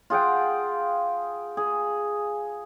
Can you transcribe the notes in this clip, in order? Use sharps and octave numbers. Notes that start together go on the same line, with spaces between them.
F4 G#4 F#5 G5
G#4